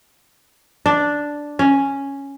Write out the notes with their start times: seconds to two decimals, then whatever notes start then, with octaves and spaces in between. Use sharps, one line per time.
0.86 D4
1.59 C#4